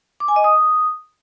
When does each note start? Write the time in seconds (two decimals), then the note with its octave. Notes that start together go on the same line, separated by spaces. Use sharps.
0.20 D6
0.28 G#5
0.36 D#5
0.44 D#6